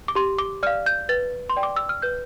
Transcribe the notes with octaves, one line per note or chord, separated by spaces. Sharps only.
D6
G4 C6
D6
D5 F5 F6
G6
B4 A6
C6
D5 G5
D6
E6
F6
B4 G6